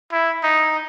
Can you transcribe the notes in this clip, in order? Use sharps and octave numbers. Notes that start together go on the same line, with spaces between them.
E4
D#4